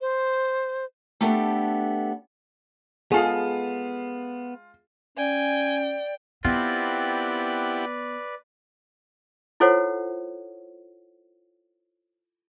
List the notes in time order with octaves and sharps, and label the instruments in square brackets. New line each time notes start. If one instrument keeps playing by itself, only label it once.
[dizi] C5
[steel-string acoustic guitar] A3 B3 D4 G4 A4
[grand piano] G#3 F4 F5 [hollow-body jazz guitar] B3 A4 [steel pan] G#4
[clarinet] C#4 [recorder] D5 [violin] G5 [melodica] G#5
[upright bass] B3 [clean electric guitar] C4 F4 [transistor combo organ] E4 G4 F#5 [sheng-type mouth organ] B4 D5
[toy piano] E4 F4 A4 C5 C#5 F#5